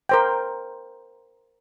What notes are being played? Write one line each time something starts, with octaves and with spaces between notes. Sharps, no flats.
A#4 C5 G5